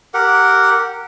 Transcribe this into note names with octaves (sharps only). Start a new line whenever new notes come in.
G4 A#4 F#5